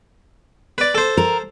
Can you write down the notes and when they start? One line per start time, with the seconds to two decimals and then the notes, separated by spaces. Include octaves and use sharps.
0.78 B4 D5
0.95 A4 C5
1.17 A#4